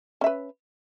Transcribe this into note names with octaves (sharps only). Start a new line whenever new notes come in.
C#4 B4 E5